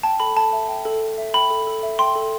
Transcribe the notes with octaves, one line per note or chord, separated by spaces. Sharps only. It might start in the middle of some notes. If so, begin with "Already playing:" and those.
G5 A5
A4 B5
A4 A5
E5
G5
A4
A4
E5
G5 B5
A4
A4
E5
G5 C6
A4